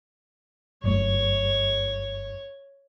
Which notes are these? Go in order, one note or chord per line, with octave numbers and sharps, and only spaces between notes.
G1 F#2 A3 C#5